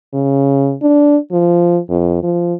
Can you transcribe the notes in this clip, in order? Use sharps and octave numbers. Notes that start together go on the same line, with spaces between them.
C#3
D4
F3
F2
F3